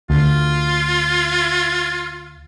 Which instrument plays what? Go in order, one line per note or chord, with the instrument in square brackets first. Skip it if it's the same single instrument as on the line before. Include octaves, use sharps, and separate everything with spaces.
[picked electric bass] D2 [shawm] F4